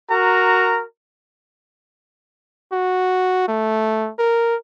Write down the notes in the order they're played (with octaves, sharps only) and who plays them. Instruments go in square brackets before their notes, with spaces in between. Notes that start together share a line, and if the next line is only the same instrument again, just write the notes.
[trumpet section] F#4 A#4 A#5
[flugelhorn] F#4
A3
A#4